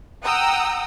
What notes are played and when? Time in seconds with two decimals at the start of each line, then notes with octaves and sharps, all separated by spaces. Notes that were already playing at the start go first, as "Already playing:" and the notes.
0.23 F#5 G5 A#5 D#6 E6